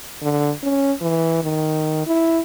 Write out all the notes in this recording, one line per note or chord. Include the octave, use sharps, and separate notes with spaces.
D3
C#4
E3
D#3
E4